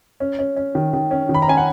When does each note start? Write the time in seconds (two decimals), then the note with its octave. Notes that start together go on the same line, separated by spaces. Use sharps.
0.20 C#4
0.39 C#4
0.57 C#4
0.75 D#3
0.93 D#3
1.11 C#4
1.29 D#3
1.34 B5
1.42 A#5
1.48 C#4 G#5
1.57 F#5